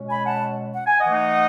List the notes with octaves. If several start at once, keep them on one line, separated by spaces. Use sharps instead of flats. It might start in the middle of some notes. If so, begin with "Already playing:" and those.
Already playing: B2 G#3 C#4
G#5 B5
F#5 A5
F#5
G#5
D#5 F#5
E3 A3 D#4